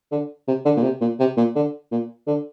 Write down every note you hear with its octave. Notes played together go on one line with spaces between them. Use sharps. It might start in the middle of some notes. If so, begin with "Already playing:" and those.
D3
C3
D3
A#2
C3
A#2
C3
A#2
D3
A#2
D3